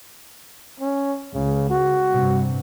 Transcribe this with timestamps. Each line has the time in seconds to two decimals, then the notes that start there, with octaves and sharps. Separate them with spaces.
0.80 C#4
1.33 C#2 C#3
1.70 F#4
2.11 G2 C3